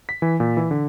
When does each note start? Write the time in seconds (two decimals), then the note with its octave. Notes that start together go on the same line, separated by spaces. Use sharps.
0.09 B6
0.22 E3
0.40 A#2
0.57 E3
0.71 D3